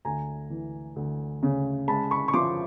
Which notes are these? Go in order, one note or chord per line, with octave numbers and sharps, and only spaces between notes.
D2 G#5 A#5
E3
D2
C#3
G#3 A5 B5
B5 C#6
C#6
F3 C6 D6